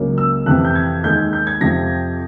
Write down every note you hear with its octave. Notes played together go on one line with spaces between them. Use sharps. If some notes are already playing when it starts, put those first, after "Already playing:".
Already playing: C#2 C#3 F#3 A#3
E6
F2 C3 E3 F#6
G6
G#6
D#2 D#3 G#3 G6
G6
G#6
F2 C3 F3 A#6